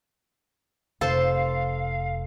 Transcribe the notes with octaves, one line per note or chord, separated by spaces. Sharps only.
F1 A4 C5 F5